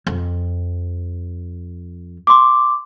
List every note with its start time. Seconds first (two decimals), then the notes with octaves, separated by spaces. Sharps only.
0.07 F2
2.27 C6 D6